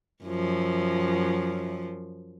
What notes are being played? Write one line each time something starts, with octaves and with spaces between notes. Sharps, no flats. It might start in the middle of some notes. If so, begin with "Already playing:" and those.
F#2 F3